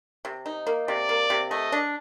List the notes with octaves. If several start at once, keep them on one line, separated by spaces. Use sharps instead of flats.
C3
D#4
A#3
C3 D5
A#3
C3
A3 D#5
D4